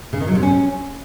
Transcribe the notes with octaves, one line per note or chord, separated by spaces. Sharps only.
C#3
D#3
F#3
C3
C#4